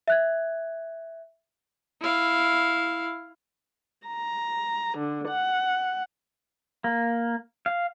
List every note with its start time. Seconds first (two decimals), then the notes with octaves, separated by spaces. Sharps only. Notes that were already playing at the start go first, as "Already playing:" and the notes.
0.08 E5 F#6 G#6
2.02 E4 F5
4.07 A#5
4.98 D3
5.28 F#5
6.84 A#3
7.66 F5